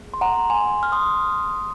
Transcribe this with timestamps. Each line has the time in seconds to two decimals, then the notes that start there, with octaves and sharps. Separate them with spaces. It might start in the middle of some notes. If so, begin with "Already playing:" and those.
Already playing: A#3 G#4
0.14 C6
0.21 F#5 A#5
0.50 G#5 C6
0.83 F6
0.92 C6 D#6